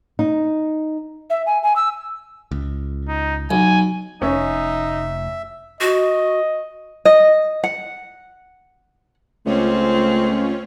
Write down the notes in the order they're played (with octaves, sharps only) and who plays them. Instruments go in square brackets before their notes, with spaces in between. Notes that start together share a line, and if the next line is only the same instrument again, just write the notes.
[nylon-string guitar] D#4
[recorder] E5
G#5
G#5
E6
[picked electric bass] C#2
[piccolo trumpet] D#4
[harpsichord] B1 [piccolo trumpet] G#5
[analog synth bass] F1 [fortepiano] C#4 [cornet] D#4 [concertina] E5
[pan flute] F#4 [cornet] D#5
[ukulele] D#5
F#5
[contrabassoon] C#2 [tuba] A3 [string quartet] C4 [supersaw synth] C#4 F4 C#5